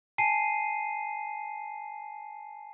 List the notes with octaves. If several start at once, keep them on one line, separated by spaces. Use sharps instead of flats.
G#5 A5 C7 D#7